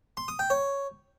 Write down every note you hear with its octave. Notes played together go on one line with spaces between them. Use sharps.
C6
D#6
G5
C#5